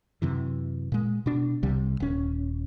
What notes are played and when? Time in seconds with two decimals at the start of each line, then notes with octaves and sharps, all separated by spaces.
0.22 F#2 C3 E3
0.92 A#2 G#3
1.26 B2 D4
1.63 C2 C3 G3
2.00 D#1 C#4